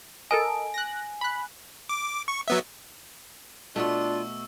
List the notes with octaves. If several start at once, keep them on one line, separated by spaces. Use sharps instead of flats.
A4 A#4 D#5 G#5
F#6 A#6
B5 F#6
D6
C#6
F#3 B3 E5
B2 A3 D4 F4 C#6 E6